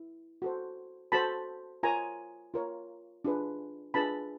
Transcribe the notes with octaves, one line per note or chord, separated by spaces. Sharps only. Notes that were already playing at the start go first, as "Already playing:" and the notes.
Already playing: E4
F#4 A4 C5
F#4 A4 C5 A5 B5
F4 A#4 C#5 G#5 A#5
F4 A#4 C#5
D4 F4 G#4 B4
D4 F4 G#4 B4 A5 B5